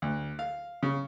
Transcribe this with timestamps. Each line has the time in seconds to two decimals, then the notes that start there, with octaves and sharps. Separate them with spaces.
0.02 D2
0.39 F5
0.83 C#3